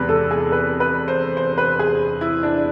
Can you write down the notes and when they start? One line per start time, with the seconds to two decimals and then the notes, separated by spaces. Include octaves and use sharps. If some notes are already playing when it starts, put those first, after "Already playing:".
Already playing: E2 C3 G#3 B4
0.09 A4
0.31 G#4
0.52 B4
0.80 B4
1.08 C5
1.37 C5
1.58 B4
1.79 G#4
2.21 E4
2.43 D4